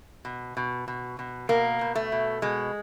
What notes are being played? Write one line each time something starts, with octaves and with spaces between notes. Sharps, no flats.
B2
B2
B2
B2
B2 A#3
B2
A3
B2
B2 G#3